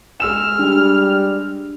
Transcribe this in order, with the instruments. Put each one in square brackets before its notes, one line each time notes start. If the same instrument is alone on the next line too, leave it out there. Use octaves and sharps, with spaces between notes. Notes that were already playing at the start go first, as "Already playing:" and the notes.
[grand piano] G#3 E6 E7 [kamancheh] F6
[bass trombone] G3 [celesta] D4